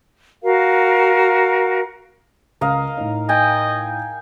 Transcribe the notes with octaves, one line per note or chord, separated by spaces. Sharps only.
F#4 A#4 F5
C#2 A#4 D#5 F5
A2 D#4
D#5 G5 G#5